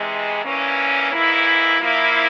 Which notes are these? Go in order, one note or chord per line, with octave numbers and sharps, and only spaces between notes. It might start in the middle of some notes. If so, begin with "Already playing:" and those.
Already playing: C3 E3 G#3
G2 E3 A#3 C#4
G#2 E3 A#3 E4
F3 A#3 E4